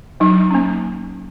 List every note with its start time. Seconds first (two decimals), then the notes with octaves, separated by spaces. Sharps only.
0.20 F#3 D#4
0.50 A#3 C#4